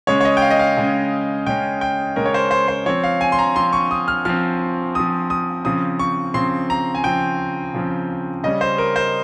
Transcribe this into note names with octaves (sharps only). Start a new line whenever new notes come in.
C#3 G#3 C#4 C#5
C#5
D#5
G5
F5
D#5
F5
C#3 G#3 C#4
C#3 G#3 C#4 G5
G5
C#3 G#3 C#4 A#4
C#5
C5
C5
C5
F3 C4 C#5
F5
G#5
C6
A#5
F3 C4 C6
C#6
D#6
F6
F3 C4 F6
F3 C4 D#6
D#6
C#3 F3 C4 D#6
C#6
C#3 F3 C4 C6
A#5
G#5
C#3 F3 C4 G5
C#3 F3 C4
C#3 G3 C#4 D#5
C5
A#4
C5